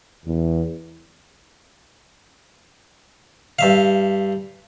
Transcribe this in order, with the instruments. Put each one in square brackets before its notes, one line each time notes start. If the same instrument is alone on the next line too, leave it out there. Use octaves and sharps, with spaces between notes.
[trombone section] E2
[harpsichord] G2 E5 F5